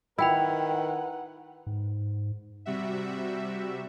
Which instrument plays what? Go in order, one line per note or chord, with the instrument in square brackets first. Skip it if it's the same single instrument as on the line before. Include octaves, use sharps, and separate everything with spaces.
[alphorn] D#3 [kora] E4 [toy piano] F4 G5 B5 [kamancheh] B4 F#5
[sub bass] G#2
[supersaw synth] C3 G3 F#4 E5